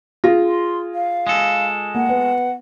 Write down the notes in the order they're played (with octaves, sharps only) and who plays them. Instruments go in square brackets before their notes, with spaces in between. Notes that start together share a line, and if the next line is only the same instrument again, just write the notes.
[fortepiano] F4 [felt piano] G#4 A#6
[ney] C6
F5
[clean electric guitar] G#3 A4
[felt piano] A#3 [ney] F#5
[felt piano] B3